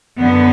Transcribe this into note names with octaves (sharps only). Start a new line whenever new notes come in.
F#2 D3 F#3 B3